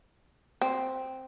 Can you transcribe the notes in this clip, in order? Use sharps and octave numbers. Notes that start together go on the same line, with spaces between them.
C4